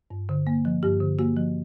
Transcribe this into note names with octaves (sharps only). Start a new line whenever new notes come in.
G2
D3
A#3
F3
G2 G4
D3
A#3 F#4
F3